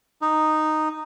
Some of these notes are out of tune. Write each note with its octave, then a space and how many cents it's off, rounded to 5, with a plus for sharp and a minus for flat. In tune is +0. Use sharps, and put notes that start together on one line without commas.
D#4 -5